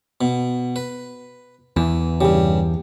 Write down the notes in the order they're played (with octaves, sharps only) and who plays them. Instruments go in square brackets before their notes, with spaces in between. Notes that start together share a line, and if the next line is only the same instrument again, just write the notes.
[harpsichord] B2
B4
[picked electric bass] E2 [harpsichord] E3
[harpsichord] G2 C#3 [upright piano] G4